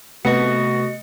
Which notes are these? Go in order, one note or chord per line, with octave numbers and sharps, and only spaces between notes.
C3 A3 B3 F#4 D#5 A#6 C#7